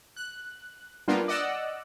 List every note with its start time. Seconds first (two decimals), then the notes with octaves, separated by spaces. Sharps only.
0.16 F#6
1.08 G3 A#3 B3 D4 F4
1.28 D5 D#5 F#5 E6